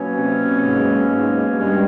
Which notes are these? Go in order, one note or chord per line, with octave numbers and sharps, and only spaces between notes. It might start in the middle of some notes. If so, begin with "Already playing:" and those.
Already playing: B2 F#3 A#3 C#4
C3 C4
G#2 G#3
G#2 G#3
G2 D#3 G3 G#3 C#4